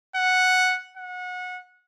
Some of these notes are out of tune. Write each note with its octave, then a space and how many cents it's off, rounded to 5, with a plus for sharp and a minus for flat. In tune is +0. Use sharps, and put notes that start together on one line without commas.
F#5 -5
F#5 -25